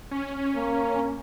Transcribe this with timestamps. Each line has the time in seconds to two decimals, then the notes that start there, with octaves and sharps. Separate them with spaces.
0.11 C#4
0.55 A#3